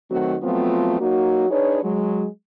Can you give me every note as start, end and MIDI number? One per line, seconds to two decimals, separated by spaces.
0.10 0.36 51
0.10 0.36 54
0.10 0.36 57
0.10 0.36 60
0.10 0.36 66
0.43 0.97 53
0.43 0.97 54
0.43 0.97 57
0.43 0.97 59
0.43 0.97 60
0.43 0.97 65
1.00 1.48 54
1.00 1.48 58
1.00 1.48 63
1.00 1.48 66
1.50 1.80 62
1.50 1.80 63
1.50 1.80 68
1.50 1.80 71
1.50 1.80 73
1.83 2.26 54
1.83 2.26 56